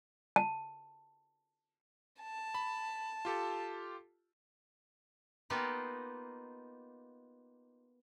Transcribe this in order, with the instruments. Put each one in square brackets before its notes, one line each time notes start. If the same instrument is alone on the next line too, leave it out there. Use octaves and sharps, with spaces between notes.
[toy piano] A5
[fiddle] A5
[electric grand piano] B5
F4 G4 A4
[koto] A#3 B3 D#4 F4 G4 D#5